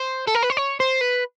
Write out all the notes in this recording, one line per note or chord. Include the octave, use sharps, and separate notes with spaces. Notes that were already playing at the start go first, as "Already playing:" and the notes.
Already playing: C5
A4
A#4
B4
C5
C#5
C5
B4